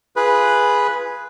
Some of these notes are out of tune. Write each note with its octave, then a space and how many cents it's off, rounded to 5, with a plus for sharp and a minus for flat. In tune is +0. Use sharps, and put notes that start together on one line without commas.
F4 -20 G#4 +0 B4 -5